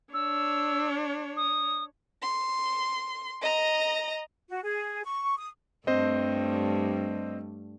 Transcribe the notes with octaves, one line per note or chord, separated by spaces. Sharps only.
D4 C#5 E6
D#6
C6
D#5 A#5
F#4
G#4
C#6
D#6
G2 G3 A3 C4 C5 D#5